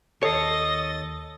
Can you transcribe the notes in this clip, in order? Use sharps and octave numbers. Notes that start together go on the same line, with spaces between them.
D#2 A4 C#5 D#5 A6 C7